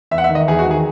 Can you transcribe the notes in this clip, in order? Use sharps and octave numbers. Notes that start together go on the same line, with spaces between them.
E2 E5
F#5
E5
D#3
D#5
E2 G#4
F#4
D#3
G#4